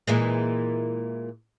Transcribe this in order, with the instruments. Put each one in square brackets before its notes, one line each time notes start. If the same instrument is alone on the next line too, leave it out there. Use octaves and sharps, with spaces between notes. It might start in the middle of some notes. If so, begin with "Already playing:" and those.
[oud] A#2 E3 G#3